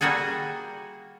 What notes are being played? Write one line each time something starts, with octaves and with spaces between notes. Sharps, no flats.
G3 A#3 F#4 G#4 A4